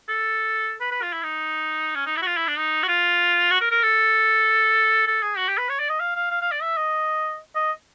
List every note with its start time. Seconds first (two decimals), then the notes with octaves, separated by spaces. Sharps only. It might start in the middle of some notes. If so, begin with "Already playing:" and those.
0.09 A4
0.81 B4
0.91 B4
1.02 F4
1.13 E4
1.23 D#4
1.95 C#4
2.06 D#4
2.17 E4
2.22 F#4
2.27 F4
2.37 E4
2.48 D4
2.58 D#4
2.83 F#4
2.88 F4
3.51 F#4
3.61 A#4
3.71 A#4
3.83 A4
5.07 A4
5.22 G#4
5.37 F#4
5.48 G4
5.58 B4
5.69 C#5
5.79 D5
5.89 D#5
6.00 F5
6.16 F5
6.31 F5
6.41 F5
6.52 D5
6.62 E5
6.77 D#5
7.55 D#5